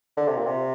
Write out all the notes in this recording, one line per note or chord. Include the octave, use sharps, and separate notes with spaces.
D3
C3
A#2
C3